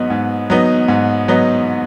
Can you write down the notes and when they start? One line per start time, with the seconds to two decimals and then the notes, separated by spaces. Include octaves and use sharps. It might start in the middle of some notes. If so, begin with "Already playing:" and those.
Already playing: G#2 F#3 B3 D#4
0.10 G#2
0.50 F#3 B3 D#4
0.88 G#2
1.28 F#3 B3 D#4